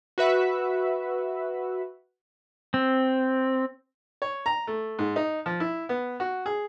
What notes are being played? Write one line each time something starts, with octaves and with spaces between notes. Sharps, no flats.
F#4 B4 E5
C4
C#5
A#5
A3
G#2
D#4
F3
E4
B3
F#4
G#4